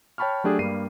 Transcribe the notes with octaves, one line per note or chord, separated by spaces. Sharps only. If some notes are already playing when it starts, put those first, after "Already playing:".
C#5 G5 A5 B5 C#6 F6
F#3 A3 D4 G4 G#4
G2 G3 A#3 C7 D#7